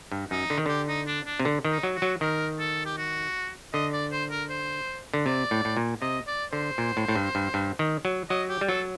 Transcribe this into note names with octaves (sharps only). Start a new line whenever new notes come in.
G2
F#2 D#4
D3
D#3
D3 G4
D#4
D4
D4
C3
D3
D#3
D#4
F#3
F#4
F#3
D#3 A#4
A4
G4
F#4
D3 D#5
D5
C5
A#4
C5
D3
C3 D5
A2
A2
A#2
C3 D#5
D5
D3 C5
A#2
A2
A2
G2
G2
G2
D#3
F#3
F#3 D#5
G4
G3
F#3 A4